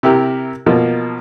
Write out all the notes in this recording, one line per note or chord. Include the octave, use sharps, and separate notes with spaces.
C3 E4 G4 A#4
B2 F3 A#3